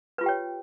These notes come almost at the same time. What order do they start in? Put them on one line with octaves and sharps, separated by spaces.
B4 F4 G4 G5 C#5